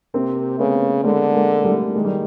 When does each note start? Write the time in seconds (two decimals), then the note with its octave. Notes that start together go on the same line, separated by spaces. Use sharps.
0.14 C3 A#3 C4
0.59 C#3 A3 B3
1.04 D3 G#3 A#3
1.35 G#3 A#3
1.65 G3 A3
1.95 D#3 G#3
2.05 G3